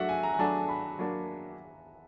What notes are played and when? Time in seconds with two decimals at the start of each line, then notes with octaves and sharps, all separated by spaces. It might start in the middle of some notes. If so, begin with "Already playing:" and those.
Already playing: F#3 A3 D4 F#4 E5 F#5
0.09 G#5
0.23 A#5
0.34 G#5
0.39 F#3 A3 D4 F#4 A5
0.69 B5
0.99 F#3 A#3 D4